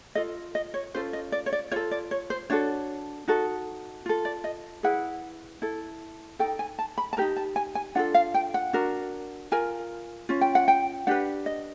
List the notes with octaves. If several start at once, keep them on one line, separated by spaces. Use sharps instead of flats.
F4 A4 D#5
D#5
C#5
C#4 F4 A4 C5
D#5
D5
C#5
D5
F4 A4 C#5
D5
C#5
C5
D4 F#4 A4 C#5
D#4 F#4 A4
F4 A4
D5
D#5
E4 G#4 B4 F#5
E4 A4
D#4 F#4 A4 G5
G#5
A5
B5
A5
D#4 G4 A#4 A#5
A5
G#5
G#5
D4 F4 A4 F#5
F5
G5
F#5
D4 F#4 A#4
F4 A#4 G#5
C#4 F4
G5
F#5
G5
D4 G4 B4 F#5
D#5